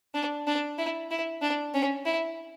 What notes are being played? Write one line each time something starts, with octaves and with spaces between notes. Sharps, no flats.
D4
D4
E4
E4
D4
C#4
E4